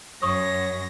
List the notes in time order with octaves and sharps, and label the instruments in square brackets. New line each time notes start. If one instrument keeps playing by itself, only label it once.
[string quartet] F#2 A#6 [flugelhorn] C#5 [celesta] C#6 D#6